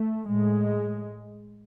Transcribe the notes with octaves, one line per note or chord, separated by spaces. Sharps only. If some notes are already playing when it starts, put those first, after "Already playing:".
Already playing: A3
A2 G#3